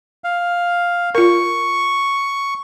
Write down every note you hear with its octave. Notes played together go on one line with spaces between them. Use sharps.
F5
F4 A#4 C#6